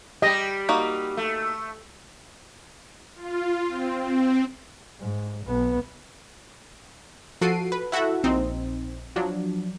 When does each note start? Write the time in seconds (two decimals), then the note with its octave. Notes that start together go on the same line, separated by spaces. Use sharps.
0.22 G3 G4 D#5
0.69 A#3 D#4 F#4
1.17 A3
3.16 F4
3.68 C4
4.03 C4
5.00 G#2
5.46 B1 B3
7.41 F3 F#4 A4 C7 D7 D#7
7.72 B4
7.92 E4 F#4 A4 E5 F#5
8.23 A#1 C4 D#4
9.16 F3 F#3 D4